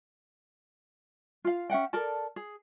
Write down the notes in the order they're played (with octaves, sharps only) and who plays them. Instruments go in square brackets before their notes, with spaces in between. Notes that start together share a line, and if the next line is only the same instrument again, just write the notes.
[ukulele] F4 F5
C#4 E5 F#5 G5
A4 A#4 D5 A5
G#4